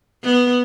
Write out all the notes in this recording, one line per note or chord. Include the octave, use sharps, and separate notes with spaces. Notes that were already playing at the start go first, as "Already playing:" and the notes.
B3